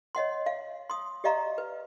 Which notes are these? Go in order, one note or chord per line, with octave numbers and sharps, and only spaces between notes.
C#5 D#5 F#5 C6
F5
C6 D#6
G4 D5 D#5 F5 A#5 C6
B4